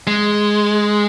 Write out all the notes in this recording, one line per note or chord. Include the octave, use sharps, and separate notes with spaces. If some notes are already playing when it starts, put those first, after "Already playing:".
G#3